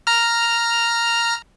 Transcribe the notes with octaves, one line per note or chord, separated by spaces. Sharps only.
A#5 F6